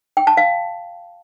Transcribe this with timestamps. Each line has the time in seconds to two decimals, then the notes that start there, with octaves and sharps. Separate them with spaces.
0.17 G5
0.27 A5
0.37 F5